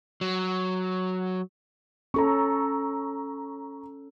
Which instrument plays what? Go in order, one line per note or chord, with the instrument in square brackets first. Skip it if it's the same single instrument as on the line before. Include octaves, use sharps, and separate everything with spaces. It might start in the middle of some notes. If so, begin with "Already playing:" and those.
[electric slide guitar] F#3
[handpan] C#4 A4 [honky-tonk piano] A#5 C#6